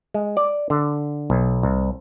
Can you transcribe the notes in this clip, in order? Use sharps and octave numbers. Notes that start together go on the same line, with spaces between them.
G#3
D5
D3
B1
C2